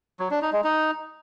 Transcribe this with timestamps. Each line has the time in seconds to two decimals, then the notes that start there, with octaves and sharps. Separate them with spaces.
0.20 F#3
0.31 D4
0.42 D#4
0.53 G#3
0.64 D#4